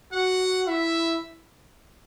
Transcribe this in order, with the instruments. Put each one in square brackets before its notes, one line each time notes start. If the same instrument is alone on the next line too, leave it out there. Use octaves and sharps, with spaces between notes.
[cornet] F#4 [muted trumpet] F#5
[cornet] E4 [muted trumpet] E5